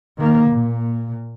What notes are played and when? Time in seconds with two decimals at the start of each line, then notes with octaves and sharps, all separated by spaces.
0.18 D#3 A#3
0.50 A#2